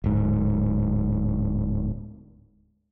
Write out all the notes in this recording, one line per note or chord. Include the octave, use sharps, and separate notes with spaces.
D1 G#2